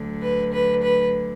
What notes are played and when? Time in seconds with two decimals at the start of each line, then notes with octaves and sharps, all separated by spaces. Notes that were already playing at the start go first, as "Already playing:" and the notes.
Already playing: D2 D3 F#3
0.22 B4
0.53 B4
0.83 B4